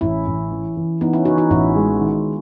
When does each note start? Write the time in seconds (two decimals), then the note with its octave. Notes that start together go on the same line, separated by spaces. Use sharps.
0.01 A1 C#4 E4
0.27 A1
0.51 E3
0.77 E3
1.01 E3 B3 D#4
1.13 C#4 E4
1.25 E3 D#4 F#4
1.38 D#4 F#4
1.50 A1 C#4 E4
1.76 G#3
2.01 D#3